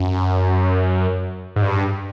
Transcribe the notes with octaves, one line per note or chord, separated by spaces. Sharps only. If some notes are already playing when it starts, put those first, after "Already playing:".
Already playing: F#2
G#2
G2